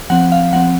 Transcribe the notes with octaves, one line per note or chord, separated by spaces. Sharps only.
F3 C4 F#5
F5
F3 C4 F#5